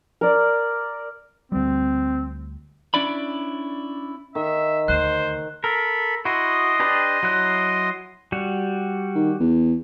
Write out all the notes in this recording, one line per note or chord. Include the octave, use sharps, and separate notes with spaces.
A#4 D5
D2 G3 C4
C#4 D4 E4 D5 B5
D#3 E5
D2 C5 F#6
A4 A#4 B5
E4 F#4 D#5 C6 D#6
D4 G4 B4
F#3 E4 F#6
G3 F#4
D#3
E2